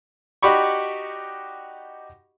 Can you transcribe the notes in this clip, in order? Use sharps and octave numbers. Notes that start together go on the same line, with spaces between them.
D#4 F#4 G4 D5 B5 C#6